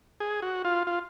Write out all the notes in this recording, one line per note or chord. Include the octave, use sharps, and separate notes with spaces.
G#4
F#4
F4
F4